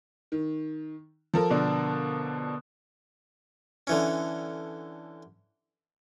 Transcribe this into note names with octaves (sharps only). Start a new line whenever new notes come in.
D#3
F3 A4 A#4
B2 D3 D4
D3 E3 C#4